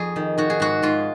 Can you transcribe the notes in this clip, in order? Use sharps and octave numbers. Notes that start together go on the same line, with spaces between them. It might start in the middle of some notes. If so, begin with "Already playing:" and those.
Already playing: F2 G#4
D#3
D#3 F#4
G#4
G#2 F#4
G#2 F4